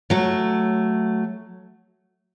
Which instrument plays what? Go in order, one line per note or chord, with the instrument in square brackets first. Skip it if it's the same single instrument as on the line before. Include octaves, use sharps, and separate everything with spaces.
[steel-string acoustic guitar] F#3 A3